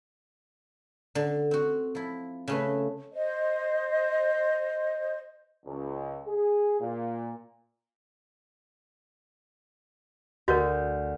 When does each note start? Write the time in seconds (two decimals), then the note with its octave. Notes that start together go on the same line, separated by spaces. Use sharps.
1.15 D3
1.51 C4 F#4
1.95 F3 E4
2.48 C#3 A3 B4
3.12 C5 D#5
5.65 C#2
6.27 G#4
6.80 A#2
10.48 D2 F#4 A#4 G6 A6